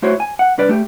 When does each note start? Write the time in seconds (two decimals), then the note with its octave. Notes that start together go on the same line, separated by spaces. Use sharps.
0.02 A3 E4 F#4 C5 C#5
0.20 G#5
0.39 F#5
0.58 C2 D4 B4 D5
0.69 A3 G4